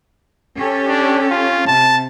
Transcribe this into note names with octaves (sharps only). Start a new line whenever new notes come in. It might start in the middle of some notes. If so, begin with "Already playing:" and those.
C#4 G4 A4
D4
F4
C3 A5